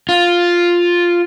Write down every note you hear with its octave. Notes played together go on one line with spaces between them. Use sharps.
F4